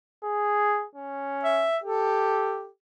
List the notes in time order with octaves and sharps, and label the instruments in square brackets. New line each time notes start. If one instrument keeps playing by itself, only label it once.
[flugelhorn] G#4
C#4
[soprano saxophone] E5
[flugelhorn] G4 [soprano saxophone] A4